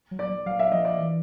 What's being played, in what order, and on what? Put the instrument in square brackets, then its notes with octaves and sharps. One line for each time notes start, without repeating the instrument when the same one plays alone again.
[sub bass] F#3
[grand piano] D5
[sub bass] F#3 [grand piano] F5
[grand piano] E5
[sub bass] F3 [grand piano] D#5
[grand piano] D5
[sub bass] E3